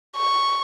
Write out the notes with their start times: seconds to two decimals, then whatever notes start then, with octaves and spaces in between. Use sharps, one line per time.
0.17 C#6